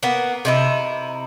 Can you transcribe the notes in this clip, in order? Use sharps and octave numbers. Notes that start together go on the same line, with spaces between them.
A#3 B3
C3 D#4 E4